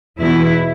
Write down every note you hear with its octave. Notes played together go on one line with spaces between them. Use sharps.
E2 B2 E4